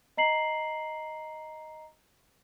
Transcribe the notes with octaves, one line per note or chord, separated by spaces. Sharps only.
D#5 A#5 C7 F#7